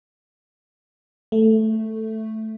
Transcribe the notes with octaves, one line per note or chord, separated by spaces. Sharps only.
A3